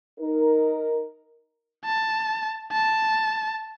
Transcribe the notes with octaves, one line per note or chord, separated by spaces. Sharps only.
D#4 A#4
A5
A5